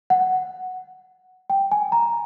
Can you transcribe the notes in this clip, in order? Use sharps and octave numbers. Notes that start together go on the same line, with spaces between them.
F#5
G5
G#5
A#5